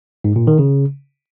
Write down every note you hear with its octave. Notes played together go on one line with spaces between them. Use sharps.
G#2
A#2
D#3
C#3